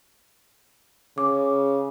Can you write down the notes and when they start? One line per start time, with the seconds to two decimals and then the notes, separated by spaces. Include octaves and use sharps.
1.18 C#3 D6